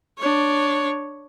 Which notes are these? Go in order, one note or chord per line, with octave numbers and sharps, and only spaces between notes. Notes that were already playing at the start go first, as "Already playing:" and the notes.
D4 C#5